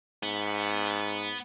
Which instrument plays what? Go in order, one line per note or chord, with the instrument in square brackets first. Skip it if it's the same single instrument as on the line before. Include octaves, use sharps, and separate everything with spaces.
[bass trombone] G#2 [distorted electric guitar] B3